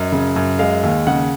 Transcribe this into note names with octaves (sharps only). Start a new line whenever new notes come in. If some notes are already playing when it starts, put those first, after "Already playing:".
Already playing: F#2 D#5
C#3
F#2
G#3 F5
D#2
C#3 F#5